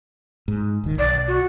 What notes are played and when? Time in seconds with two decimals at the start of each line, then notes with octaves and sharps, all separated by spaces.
0.48 G#2
0.84 D#1 D#3
0.99 B1 D5
1.28 F#4